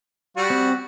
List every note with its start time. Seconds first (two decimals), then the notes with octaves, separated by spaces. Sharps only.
0.37 G3 F#4
0.50 C4